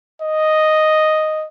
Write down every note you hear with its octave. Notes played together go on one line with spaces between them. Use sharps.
D#5